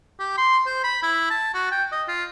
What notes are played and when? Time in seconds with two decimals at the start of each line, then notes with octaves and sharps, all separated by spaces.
0.19 G4
0.38 C6
0.66 C5
0.84 B5
1.03 E4
1.30 A5
1.55 F#4
1.71 G5
1.92 D#5
2.08 F4